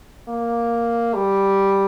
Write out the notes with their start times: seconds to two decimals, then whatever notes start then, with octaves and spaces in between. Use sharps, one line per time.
0.28 A#3
1.15 G3